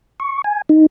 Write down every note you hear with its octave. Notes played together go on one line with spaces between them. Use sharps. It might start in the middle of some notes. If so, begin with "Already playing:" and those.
C#6
G#5
D#4